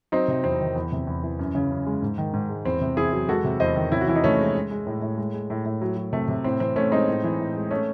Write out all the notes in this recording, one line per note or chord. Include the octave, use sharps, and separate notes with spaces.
F#3 C4 D#4
C3
E2 C4
D#3
E2
C3
E2
E3
F#2
C#3
F#2
G#3
G#2
D#3
G#2
G#3
E2 C4
C3
E2 E4 G#4
F#3
G#3 F#4 A4
C3
E2 C5 D#5
D#3
C3 C#4 E4
F#4
E3 E4
D#4
C3 A3 C#4
G#3
G#3
G#3
A2
A2
G#3
G#3
A2
A2
F#3
F#3
C3 A3
C3
A2 C4
E3 C4
A2 A3 C#4
G#3 C4 D#4
A2
E3
A2
G#3
A3 C#4